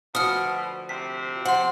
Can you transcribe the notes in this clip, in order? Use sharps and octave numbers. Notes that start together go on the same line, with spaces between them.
D2 B2 F3 D#6 F6 C#7
C3 B6
F3 F#5 C6